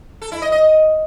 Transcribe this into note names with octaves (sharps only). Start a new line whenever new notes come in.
A4
E4
D#5
D#5